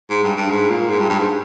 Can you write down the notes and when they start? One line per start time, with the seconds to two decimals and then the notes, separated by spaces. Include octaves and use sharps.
0.10 G#2
0.24 G2
0.36 G2
0.50 G#2
0.70 A#2
0.89 G#2
0.99 G2
1.10 G2
1.19 G#2